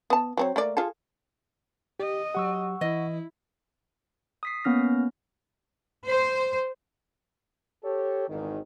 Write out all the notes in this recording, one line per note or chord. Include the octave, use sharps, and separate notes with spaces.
B3 A5
F#3 C4 C#5
A3 A#3 D5
F4 G#4 A4
G4 D#5
F#3 G4 F#5 C#6 E6
E3 E4 D#5
D#6 B6 C7
A#3 B3 C#4 F6 A#6
C5
G4 A4 C#5
G#1 E2 G#2 D#3